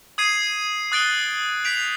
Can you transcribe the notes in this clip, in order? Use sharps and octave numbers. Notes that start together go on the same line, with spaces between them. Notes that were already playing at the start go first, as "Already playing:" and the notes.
D#6 G#6 C7 D#7
D#6 F#6 A6 D7 G7
G6 B6 D7 F7